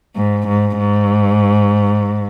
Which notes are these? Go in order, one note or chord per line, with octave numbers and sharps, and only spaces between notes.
G#2
G#2
G#2